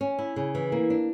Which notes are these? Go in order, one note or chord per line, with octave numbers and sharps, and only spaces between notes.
C#4
E4
C#3
E3
A#3
D4